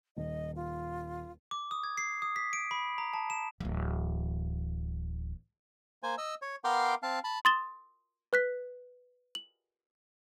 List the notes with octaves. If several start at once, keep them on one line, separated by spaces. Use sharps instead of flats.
D#1 D#5
F4
D6
D#6
G#6
C7
D#6
B6
D7
B5
A#5
A5
E7
D1 E3
A#3 C5 G#5
D#5 E6
C#5
B3 A#4 F5 G5 C6 D6
C4 F5 A5
A5 B5
C6 D#6 A6 E7 G7
B4 F#6 B6
F#7